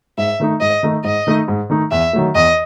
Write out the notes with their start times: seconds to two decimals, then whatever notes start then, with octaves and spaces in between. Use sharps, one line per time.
0.18 G#2 E5
0.40 D#3 A3 D#4
0.61 G#2 D#5
0.83 D#3 A3 D#4
1.04 G#2 D#5
1.27 D#3 A3 D#4
1.48 G#2
1.70 D#3 A3 D#4
1.91 E2 E5
2.13 D#3 F#3 A3
2.35 E2 D#5